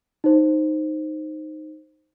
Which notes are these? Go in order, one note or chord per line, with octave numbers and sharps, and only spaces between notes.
D#4 C5